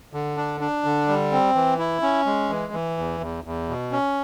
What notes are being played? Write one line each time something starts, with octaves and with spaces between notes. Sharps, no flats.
D3
D4
D4
D3
G3
C4
E3
E4
C#4
G#3
E3
E3
E2
E2
E2
B2
C#4